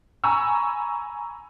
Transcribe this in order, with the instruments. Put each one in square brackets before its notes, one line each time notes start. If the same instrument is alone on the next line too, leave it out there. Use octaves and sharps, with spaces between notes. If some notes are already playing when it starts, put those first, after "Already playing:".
[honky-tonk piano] G#5 A#5 B5 C#6 E6